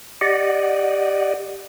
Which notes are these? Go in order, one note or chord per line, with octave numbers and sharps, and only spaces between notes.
G4 D5 D#5 F#5